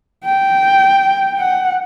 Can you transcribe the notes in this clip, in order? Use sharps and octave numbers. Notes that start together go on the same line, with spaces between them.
G5
F#5